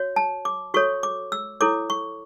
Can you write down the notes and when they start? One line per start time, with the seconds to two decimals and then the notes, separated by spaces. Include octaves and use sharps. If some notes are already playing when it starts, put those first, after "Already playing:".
Already playing: F#4 C#5
0.16 A5
0.45 D6
0.74 F#4 A4 C#5 C#6
1.03 D6
1.32 E6
1.61 E4 A4 C#5 D6
1.90 C#6